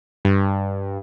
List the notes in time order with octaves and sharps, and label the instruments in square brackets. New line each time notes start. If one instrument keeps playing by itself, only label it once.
[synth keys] G2